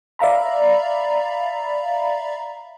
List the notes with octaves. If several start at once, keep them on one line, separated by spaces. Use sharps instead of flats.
D5 E5 F5 A#5 B5